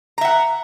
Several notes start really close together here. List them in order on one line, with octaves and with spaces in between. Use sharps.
A#5 E5 F#5